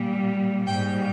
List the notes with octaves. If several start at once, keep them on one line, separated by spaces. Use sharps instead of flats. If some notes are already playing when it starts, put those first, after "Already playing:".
Already playing: A#2 G3
G#2 G3 G5